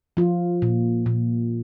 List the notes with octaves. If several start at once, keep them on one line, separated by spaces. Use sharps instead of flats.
F3 F4
A#2
A#2